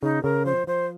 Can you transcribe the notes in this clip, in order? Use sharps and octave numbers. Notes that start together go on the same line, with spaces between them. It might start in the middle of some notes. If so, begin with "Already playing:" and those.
C#3 D#4
C#3 A#4
F3 C5
F3 C5